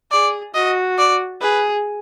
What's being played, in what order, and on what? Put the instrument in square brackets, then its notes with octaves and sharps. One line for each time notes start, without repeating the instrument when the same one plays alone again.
[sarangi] G#4 [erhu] D5
[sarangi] F#4 [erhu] D#5
[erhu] D5
[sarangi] G#4 [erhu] B4